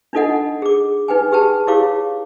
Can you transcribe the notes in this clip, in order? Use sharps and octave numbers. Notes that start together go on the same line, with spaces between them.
D4 D#4 F4 A4 D#5 F#5
G#4 D6
D#4 B4 G5 G#5
G4 G#4 B4 G5 A5
E4 G4 G#4 C#5 F5 D6